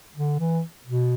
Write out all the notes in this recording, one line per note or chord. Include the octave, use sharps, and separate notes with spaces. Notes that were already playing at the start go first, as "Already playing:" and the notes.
D3
E3
B2